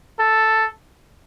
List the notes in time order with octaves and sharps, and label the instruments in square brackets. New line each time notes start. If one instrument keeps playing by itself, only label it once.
[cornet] A4